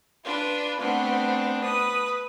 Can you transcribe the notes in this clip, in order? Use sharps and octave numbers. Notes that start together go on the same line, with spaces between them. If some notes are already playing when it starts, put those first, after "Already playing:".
D4 F4 B4
A3 B3 C4 D4
B4 D#6